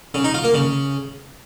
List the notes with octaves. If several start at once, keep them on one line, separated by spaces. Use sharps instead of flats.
C#3
D#4
F4
A#3
C#3